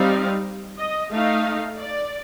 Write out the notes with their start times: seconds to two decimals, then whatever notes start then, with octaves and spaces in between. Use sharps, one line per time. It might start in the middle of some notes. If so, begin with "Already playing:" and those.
Already playing: G3 C4 D#4 F5
0.79 D#5
1.11 A3 D#4 F5
1.77 D5